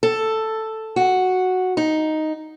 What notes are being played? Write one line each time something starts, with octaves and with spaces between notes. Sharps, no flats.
A4
F#4
D#4